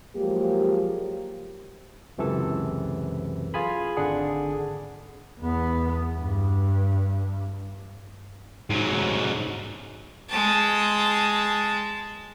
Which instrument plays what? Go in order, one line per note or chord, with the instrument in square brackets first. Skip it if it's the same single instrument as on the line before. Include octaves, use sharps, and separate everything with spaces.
[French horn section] F3 F#3 G#3 A#3 G4
[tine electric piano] C#2 F#2 C3 E3 A4
F4 G#4 G#5 B5
G#1 D3 D4 G#4 F#5
[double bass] E2 B3
G2
[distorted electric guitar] G#2 F#3
[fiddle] G#3 A5